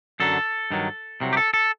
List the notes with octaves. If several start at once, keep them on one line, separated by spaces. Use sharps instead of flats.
F#2 D3 F#3 A4
G2 D#3 F#3
C2 C3 F#3
G4
A4
A4